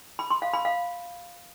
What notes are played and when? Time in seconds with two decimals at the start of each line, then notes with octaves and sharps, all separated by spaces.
0.19 B5
0.30 C6
0.42 F5
0.53 B5
0.65 F5